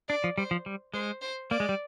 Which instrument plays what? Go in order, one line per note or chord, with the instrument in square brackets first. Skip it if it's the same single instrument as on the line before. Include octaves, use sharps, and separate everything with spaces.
[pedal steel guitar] D4 [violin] D5
[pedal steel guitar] F3
[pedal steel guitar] G3 [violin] C5
[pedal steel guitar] F3
G3
[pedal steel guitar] G#3 [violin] C5
[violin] C5
[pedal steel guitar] A#3 [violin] D5
[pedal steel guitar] G#3
G3